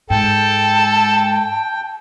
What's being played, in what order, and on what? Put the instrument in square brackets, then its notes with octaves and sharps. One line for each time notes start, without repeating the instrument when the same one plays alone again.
[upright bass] G#2 [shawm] A4 [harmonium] G5 [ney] A5